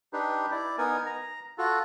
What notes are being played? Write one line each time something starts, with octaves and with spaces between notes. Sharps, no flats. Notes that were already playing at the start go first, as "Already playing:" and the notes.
D4 D#4 G4 B4
E4 D5
B3 D#4 A#4 G#5
A#5
F4 F#4 A4